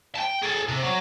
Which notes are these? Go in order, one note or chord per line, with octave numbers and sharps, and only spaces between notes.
G5 A5
G#4 A4
C3
F#3